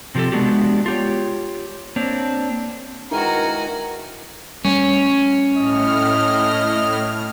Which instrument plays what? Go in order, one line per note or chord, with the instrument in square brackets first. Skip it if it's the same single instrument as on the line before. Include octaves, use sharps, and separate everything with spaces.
[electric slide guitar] C3 F3 G#3 G4 A4
G#3 B3 D4 F#4 G4
F4 G4 C#5
A#3 C4 D4 C#5
[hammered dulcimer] D#3 E3 G#3 [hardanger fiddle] F#4 G#5 [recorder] A#4 [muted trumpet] A#5
[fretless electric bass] G3 A3 [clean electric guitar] C#4
[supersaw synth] A2 F6 [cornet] D#5